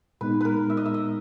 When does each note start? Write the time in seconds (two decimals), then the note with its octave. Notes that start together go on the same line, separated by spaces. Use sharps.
0.21 A#2 G#3 B3 D#4 B4
0.41 A#4 B4
0.70 E5
0.77 D#5
0.86 E5
0.94 D#5